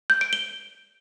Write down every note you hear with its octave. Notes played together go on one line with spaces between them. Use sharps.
G6
D7
G7